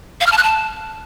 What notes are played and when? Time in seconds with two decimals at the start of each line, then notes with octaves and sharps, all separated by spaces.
0.21 F5
0.26 F6
0.32 A5
0.38 F#6
0.43 A5